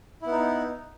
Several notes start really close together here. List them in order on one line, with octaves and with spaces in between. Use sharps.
E4 B3 D#4